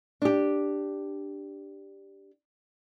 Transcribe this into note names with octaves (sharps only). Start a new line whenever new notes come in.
D4 G4